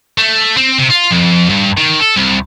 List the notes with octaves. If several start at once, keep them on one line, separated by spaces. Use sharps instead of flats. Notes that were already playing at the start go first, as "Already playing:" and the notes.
A3
C4
C3
F4
F2
G2
D#3
A4
C2